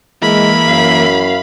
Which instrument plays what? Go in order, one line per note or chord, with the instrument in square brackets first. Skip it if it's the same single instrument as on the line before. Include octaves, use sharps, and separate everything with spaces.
[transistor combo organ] E3 A#3 [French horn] G#3 [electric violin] B5
[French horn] F#2 [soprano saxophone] F5